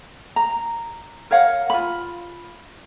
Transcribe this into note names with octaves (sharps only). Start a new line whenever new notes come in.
A#5
A#4 C#5 F5 F#5
F4 B5